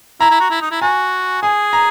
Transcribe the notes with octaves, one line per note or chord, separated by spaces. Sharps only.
E4 A#5
E4
F#4
E4
D#4
E4
F#4 G#5
G#4 G#5
A#5